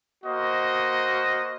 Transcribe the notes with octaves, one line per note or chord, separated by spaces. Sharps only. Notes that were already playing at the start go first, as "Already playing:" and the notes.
A#3 F#4 C5 D#5